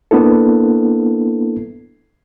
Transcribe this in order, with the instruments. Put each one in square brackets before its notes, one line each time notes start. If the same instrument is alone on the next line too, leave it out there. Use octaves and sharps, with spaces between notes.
[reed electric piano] A#3 B3 D4 E4 A4